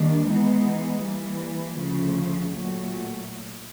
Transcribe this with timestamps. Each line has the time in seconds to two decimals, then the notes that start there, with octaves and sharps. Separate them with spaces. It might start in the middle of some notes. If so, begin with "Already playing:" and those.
Already playing: D#2 D#3 G3 A#3 D4
0.28 E3 G#3 B3 D#4
1.03 E3 G3 A#3
1.78 D2 C#3 F3 A3
2.53 A#2 F#3 A3